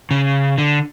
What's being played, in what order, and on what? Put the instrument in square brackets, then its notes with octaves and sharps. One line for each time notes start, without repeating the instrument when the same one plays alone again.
[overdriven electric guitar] C#3
D3